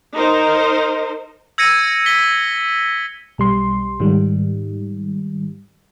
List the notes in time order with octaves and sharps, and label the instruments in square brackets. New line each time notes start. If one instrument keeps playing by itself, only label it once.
[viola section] D#4 A#4 C5
[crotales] E6 G#6 A#6 C#7 D#7
B6 G7
[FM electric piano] B1 G3 C6
G#2 D#3 G3